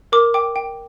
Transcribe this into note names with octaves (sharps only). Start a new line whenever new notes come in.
A#4 D6
G5 D6
G5